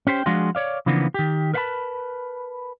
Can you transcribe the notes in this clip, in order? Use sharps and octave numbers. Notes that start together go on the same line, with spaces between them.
C#4 G4 C5 G5
F3 G#3 D4 F4 F#4 G#4
C#5 D5 F5
C#3 E3 F3 A#3 B3 D4
D#3 G4
A#4 B4 F5 F#5 A5 B5